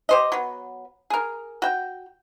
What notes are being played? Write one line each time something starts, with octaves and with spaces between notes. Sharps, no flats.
G4 C5 D#5
F#3 B3
G#4 A#4
F#4 G5